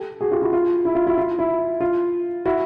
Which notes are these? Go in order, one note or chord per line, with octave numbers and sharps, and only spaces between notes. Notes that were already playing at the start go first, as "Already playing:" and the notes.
Already playing: G4 A4
F#4 G#4
F4 G4
E4 F#4
F4
E4
F4
E4 F#4
F4
E4
F4
E4 F#4